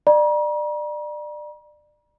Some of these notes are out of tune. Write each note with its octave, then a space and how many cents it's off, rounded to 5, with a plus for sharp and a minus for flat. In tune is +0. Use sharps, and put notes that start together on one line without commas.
D5 +25 A#5 +40